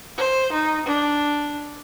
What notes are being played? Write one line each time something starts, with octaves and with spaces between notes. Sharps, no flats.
C5
D#4
D4